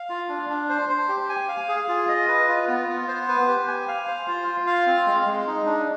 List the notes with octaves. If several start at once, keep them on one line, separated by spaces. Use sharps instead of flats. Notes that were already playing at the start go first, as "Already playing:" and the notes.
Already playing: F5
F4
D4
D4
C5
C5
G4
G#5
F5
G#4
F4
D#5
B4
F4
B3
B3
C5
B4
G4
G#5
F5
C5
F4
F4
F5
C4
G#3
G#3
D#4
D4